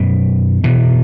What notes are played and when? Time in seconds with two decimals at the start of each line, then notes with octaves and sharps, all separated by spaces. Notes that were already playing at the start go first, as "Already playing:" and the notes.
Already playing: F#2 B2
0.64 B2 E3